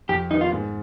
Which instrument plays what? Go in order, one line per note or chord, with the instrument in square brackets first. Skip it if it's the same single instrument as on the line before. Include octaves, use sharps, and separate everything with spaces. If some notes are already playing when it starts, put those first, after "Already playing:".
[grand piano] F2 [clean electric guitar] G4
[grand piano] D#3 G3 B3 [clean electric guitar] D#4
[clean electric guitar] F4
[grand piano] G#2